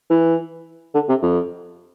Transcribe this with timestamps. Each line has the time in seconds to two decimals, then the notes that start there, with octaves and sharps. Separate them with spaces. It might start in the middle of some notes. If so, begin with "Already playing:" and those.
0.10 E3
0.95 D3
1.09 C3
1.22 F2